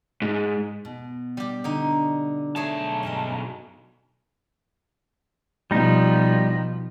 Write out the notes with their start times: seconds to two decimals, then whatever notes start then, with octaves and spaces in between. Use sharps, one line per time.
0.22 G#2
0.85 B2
1.37 G3 G4
1.64 D3 D#4
2.56 B1 A3 G#4 C#5 A5
3.03 G2 C#4 D#5
5.71 B2 F3 G3 D#4